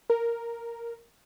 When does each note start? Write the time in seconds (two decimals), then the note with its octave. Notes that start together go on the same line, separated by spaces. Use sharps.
0.10 A#4